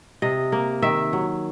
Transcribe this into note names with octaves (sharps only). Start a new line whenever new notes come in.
C3 D#5
A#3
D#3 E5
F#3